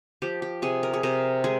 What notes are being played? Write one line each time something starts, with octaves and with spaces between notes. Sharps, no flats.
F3 G4
G4
C3 G#4
A#4
G#4
C3 A#4
G#3 G#4